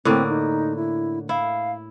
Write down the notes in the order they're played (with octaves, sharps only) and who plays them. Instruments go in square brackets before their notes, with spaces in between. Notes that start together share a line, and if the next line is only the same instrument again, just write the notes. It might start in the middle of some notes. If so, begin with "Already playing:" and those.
[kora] A2 D3 A#3 [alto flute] C4
[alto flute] D#4
E4
[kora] E4 [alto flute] F5